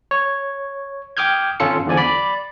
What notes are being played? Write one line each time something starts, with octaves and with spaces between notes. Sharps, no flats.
C#5
G5 D6 D#6 F6 G6 G#6
G#1 C#4 F4 A4 C#7
E2 D3 F3 D5 G#5
D5 B5